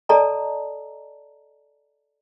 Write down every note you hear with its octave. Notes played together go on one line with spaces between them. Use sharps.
A4 D5 D#5 A5 A#5